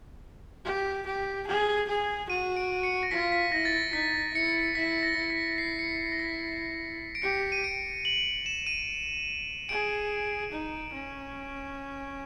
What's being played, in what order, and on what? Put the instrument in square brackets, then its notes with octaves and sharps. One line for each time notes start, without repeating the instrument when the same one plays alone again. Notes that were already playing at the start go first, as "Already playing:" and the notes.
[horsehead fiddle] G4
G4
G#4
G#4
[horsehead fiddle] F#4 [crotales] D#7
[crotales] D7
C#7
A#6
[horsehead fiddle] F4 [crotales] B6
[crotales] B6
[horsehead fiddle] E4 [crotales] A#6
[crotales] A6
A#6
[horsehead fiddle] D#4 [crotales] B6
[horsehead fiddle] E4 [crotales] C#7
[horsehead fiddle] E4 [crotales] B6
[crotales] A#6
[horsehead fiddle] E4
[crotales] B6
C7
C#7
A#6
B6
D7
[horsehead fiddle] G4 [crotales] C#7
[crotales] D#7
D7
F#7
E7
D#7
[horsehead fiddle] G#4 [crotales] D7
[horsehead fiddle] D#4
C#4